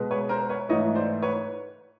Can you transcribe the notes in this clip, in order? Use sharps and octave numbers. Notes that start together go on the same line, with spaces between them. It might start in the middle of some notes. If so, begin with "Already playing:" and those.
Already playing: B2 G#3 B3
B4 C#5
A#4 C5
B4 C#5
G#2 E3 A3 C#5 D#5
C5 D5
B4 C#5